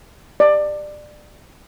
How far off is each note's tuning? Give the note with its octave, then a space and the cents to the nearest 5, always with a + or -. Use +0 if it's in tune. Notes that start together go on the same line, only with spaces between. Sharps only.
D5 +20